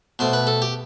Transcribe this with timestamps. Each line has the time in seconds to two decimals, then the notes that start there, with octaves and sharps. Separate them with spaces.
0.19 B2 A3 C5
0.33 B4
0.47 A4
0.62 G4